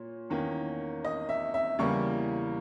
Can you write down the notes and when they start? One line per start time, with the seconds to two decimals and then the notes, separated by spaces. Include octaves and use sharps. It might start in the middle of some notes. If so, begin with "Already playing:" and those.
Already playing: A#2 C#5
0.30 E2 D#3 A#3 C#4
1.04 D#5
1.29 E5
1.54 E5
1.79 E2 C#3 E3 G3 A#3 C#6